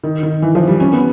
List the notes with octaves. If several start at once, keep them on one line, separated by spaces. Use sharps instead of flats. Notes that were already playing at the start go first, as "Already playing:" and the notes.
D#3
D#3
E3
F3
G3
C#4
B3